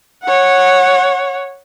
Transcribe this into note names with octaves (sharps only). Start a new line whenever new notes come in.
C#5 F#5